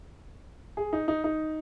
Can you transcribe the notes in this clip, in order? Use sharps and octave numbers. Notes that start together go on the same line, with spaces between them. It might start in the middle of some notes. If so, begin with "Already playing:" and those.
G#4
D#4
D#4
D#4